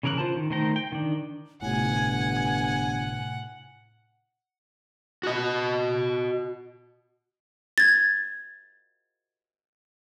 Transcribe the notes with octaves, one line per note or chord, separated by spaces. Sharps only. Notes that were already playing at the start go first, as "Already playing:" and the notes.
C#3 E3 A#4 C#5 F#6
F4 C5 A5
D#3
D#3 A3 C5 G5 A#5
G5
D#3 D4
G1 A2 C3 F#5 G#5
F#4 D#5
G#6 A6